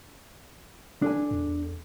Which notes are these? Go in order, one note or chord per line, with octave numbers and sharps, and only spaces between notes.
D4 A4 G#5
E2